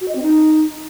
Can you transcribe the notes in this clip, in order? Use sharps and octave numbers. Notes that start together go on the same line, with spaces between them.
F#4
D#5
C4
D#4